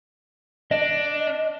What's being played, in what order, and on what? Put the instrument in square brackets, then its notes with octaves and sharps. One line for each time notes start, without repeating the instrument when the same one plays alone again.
[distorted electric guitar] D4 [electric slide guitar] D#5